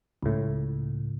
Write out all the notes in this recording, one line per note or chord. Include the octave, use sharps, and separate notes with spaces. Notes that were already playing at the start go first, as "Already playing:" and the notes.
C#2 A2